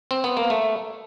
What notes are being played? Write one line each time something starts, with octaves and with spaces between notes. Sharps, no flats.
C4
B3
A#3
A3